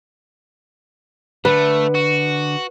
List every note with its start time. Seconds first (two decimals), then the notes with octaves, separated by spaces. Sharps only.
1.45 D3 A3 B4
1.95 F#4